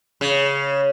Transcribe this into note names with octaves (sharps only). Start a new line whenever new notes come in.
C#3